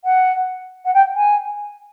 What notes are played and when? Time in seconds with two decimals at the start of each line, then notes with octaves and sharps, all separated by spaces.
0.04 F#5
0.85 F#5
0.94 G5
1.15 G#5